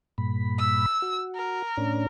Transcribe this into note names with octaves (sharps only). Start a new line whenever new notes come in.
G2 A#2 B5
E6
F#4
A#4
A2 C#4 D4